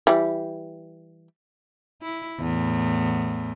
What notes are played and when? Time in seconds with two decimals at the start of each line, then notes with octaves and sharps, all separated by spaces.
0.07 E3 G3
2.02 E4
2.40 E2 A2